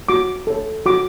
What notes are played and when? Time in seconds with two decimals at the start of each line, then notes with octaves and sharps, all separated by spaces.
0.09 F#4 D6
0.47 A4 C#5
0.86 F#4 D6